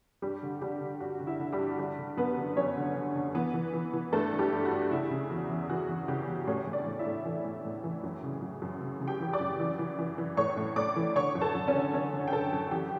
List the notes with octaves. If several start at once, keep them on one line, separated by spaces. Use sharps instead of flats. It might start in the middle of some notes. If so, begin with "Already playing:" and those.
G2 G3 G4
D3
D3 G3 G4
D3
G2 F#4
D3
E4
D3
G3 G4
G2
D3 G3 G4
D3
F#2 B3 B4
D3
F#2 C#4 C#5
D3
D3
D3
E3 B3 B4
E3
E3
E3
G2 A3 A4
G2
G3 G4
G2
F#4
G2
C#3 E4
C#3
E2 F#4
E2
E3 F#4
E2
C#3 G3 G4
E2
A2 C#4 C#5
A2
D4 D5
A2
E4 E5
A2
E3
A2
A2
E3
F#2
C#3
F#2
F#2
C#3
C#3
G4 G5
E3
D5 D6
F#2
E3
E3
E3
E3
A2 C#5 C#6
A2
A2 D5 D6
E3
D3 C#5 C#6
F#2
A4 A5
F#2
C#4 C#5
D3
D3 C#4 C#5
D3
G5
D3 A4 A5
F#2
E3 G4 G5